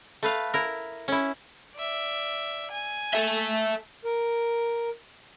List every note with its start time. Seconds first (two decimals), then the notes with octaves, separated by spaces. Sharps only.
0.23 A3 B4 F5
0.54 E4 A#4
1.08 C#4 E4
1.75 D5 E5
2.71 G#5
3.14 A4 E5
4.04 A#4